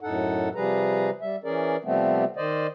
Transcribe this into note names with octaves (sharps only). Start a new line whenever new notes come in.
F#2 A2 D#4 A4 F#5
C3 F3 G3 G#4 B4 A#5
G3 E5
E3 C#4 G#4 A#4 D5
C3 F3 G3 A3 B3 C4
D#3 C5 D5 D#5